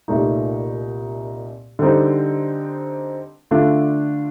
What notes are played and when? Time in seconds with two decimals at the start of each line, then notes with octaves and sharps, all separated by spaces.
0.08 C2 A#2 A3 D#4
1.79 D3 G3 C4 D#4
3.51 D3 A3 D4 F4